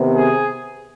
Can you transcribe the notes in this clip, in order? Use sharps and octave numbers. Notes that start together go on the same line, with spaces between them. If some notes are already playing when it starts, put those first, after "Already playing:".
Already playing: C3 D#3 B3
G#4